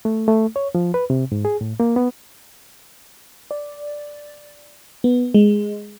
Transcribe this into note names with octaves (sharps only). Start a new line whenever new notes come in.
A3
A3
C#5
F3
B4
C3
G#2
G#4
A2
A#3
B3
D5
B3
G#3